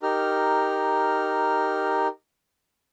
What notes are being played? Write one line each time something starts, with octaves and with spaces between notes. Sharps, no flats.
D#4 G4 A#4 F6